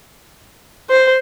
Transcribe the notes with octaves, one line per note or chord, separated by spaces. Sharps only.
C5